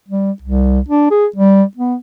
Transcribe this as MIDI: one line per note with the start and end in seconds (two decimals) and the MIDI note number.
0.08 0.31 55
0.42 0.80 36
0.88 1.06 62
1.11 1.26 68
1.36 1.63 55
1.77 1.95 59